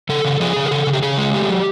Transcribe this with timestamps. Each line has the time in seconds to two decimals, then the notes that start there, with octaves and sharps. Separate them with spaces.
0.09 C#3 A4
0.25 C#3
0.40 F3 G#4
0.56 C#3
0.66 A#4
0.71 C#3 A4
0.87 C#3
0.93 G4
1.02 C#3 G#4
1.18 G#3
1.34 A3 G4
1.49 F#3